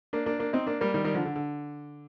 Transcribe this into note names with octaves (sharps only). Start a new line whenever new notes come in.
A#3 D4
A#3 D4
A#3 D4
C4 D#4
A#3 D4
G3 A#3
D#3 G3
D#3 G3
D3 F3
D3
D3